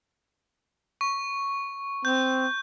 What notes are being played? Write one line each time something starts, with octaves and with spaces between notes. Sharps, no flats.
C#6
C4 G6